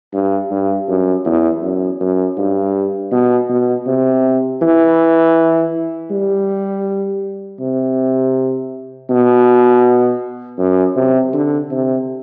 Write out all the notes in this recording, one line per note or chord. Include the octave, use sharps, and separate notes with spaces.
G2
G2
F#2
E2
F#2
F#2
G2
B2
B2
C3
E3
G3
C3
B2
F#2
C3
D3
C3